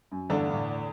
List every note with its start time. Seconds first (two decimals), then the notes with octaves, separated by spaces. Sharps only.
0.11 F#2
0.29 E2 G2 D3 A3 D4
0.49 G2
0.54 A2